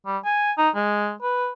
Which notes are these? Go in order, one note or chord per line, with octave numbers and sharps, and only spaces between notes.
G3
G#5
D#4
G#3
B4